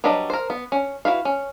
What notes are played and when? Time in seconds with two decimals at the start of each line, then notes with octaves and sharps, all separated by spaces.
0.04 F#3 G3 D4 B4 D#5
0.30 A#4 C5
0.50 B3
0.72 C#4
1.05 E4 F#4 B4 F5
1.25 C#4